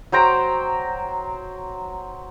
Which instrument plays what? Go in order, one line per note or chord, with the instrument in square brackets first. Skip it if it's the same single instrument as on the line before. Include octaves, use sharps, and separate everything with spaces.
[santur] F#3 C5 G5 A#5